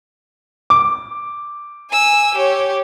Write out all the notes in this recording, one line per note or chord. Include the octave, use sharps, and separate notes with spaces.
D6
G#5 E6
G4 C#5